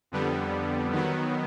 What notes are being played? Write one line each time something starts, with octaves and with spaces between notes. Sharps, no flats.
F2 D3 G3 B3
D#3 F#3 B3